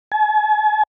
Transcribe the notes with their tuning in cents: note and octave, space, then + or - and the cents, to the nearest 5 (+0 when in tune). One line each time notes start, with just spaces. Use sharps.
G#5 +45